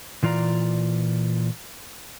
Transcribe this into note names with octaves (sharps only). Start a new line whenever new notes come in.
A#2 E3 F4 D5 A#5